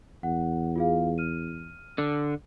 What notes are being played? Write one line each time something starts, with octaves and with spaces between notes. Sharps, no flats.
E2 F#5
F4 G#4 F5
F6 D#7
D3